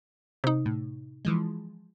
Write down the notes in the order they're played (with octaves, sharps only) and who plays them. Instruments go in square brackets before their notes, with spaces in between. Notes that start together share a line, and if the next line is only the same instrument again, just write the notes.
[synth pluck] C3 D#4
[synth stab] A2
E3 F3 G#3